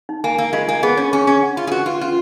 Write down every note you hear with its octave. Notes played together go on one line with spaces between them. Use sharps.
D#4
A#3 G#5
A#3 A#4
G#3 F4
A#3 G#5
B3 G#4
C#4 C#5
C#4 G#4
C#4 G#4
F#5
F4 B5
G#4
F#4 B4
F4 B4
C#4 F4